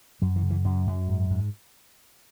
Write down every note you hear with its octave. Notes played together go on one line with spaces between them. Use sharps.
F#2 F#3
E3
C#3
E3
F#2 F#3
F#2
G#2
G#2